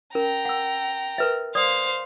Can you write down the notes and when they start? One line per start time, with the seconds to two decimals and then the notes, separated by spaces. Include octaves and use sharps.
0.15 C#4 A#4 G5 A#5
0.45 F#5 E6
1.18 A#4 B4 E5
1.55 C5 D5 F5 D#6